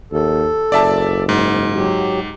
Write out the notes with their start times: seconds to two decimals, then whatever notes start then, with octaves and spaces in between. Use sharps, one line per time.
0.12 D#2 A4
0.72 F#1 D5 E5 A5
1.29 G#2
1.74 F#3 G4